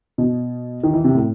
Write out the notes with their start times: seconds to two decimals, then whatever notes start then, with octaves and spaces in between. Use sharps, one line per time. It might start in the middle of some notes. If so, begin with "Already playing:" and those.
0.18 B2
0.83 D#3
0.93 E3
1.04 C3
1.15 A2